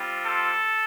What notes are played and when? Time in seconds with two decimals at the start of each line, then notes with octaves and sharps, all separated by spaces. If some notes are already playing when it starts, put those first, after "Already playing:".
Already playing: G3 C4 F4
0.25 A4